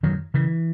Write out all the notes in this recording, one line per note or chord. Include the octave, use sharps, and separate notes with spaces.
F#2 D#3 F#3
C#3 E3